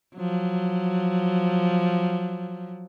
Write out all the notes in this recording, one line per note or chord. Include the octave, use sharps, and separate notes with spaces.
F3 F#3